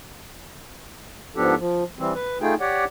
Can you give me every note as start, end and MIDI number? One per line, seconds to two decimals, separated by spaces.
1.36 1.55 44
1.36 1.55 53
1.36 1.55 59
1.36 1.55 62
1.36 1.55 67
1.36 1.55 69
1.58 1.84 53
1.99 2.13 52
1.99 2.13 55
1.99 2.13 60
2.15 2.38 71
2.41 2.55 57
2.41 2.55 63
2.41 2.55 65
2.41 2.55 68
2.41 2.55 79
2.60 2.85 67
2.60 2.85 73
2.60 2.85 74
2.60 2.85 78